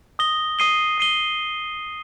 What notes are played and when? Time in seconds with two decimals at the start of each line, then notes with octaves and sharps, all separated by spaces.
0.19 D#6 A#6 G7
0.59 D#6 C7 D#7 G7
0.98 D#6 C7 D#7 G7